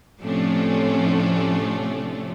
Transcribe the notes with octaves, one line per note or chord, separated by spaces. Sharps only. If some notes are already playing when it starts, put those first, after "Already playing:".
A2 C3 F3 A3 C#4 D4